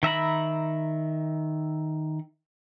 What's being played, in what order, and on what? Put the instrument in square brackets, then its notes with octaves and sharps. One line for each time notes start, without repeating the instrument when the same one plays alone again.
[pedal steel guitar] D#3 E5 A#5 B5